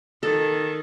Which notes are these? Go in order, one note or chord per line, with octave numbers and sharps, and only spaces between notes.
D#3 A4